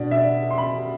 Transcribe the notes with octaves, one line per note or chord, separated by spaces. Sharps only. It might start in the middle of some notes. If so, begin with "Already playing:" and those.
Already playing: B2 B3 D4 D5
E5
D5
C6
B5